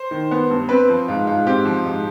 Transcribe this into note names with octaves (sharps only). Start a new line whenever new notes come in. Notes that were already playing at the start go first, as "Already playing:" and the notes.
Already playing: C5
D#3
B3
G2
C4 B4
F3
G#2 F4
G#2 F4
C4 G4
F3
G#2